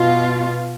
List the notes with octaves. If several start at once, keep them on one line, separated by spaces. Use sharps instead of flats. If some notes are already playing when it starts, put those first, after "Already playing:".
Already playing: B2 F4